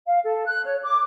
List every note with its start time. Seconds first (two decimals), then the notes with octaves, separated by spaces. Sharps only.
0.07 F5
0.24 A4
0.46 F#6
0.65 C#5
0.83 D6